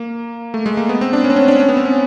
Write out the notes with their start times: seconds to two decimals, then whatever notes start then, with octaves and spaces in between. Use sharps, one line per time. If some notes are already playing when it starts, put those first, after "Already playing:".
Already playing: A#3
0.54 A3
0.66 G#3
0.77 A#3
0.89 B3
1.01 C4
1.13 D4
1.24 C#4
1.30 C4
1.36 C#4
1.48 D4
1.60 C#4
1.69 B3
1.77 C4
1.86 C#4